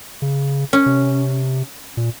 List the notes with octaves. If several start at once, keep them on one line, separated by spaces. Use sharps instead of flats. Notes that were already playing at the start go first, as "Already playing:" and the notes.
C#3
C#4
C3
A#2